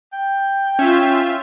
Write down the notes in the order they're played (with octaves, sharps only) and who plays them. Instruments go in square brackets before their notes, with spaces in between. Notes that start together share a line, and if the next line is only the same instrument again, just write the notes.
[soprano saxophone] G5
[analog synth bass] C#4 [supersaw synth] F4 E5